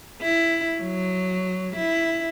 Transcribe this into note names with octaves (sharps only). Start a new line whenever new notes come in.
E4
F#3
E4